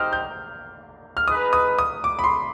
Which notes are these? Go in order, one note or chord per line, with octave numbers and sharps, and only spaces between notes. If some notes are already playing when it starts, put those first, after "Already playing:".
Already playing: D#4 G4 C5 D#5 G5 F6
G6
F6
D#4 G#4 B4 D#5 D#6
D#6
D#6
D6
B5
C6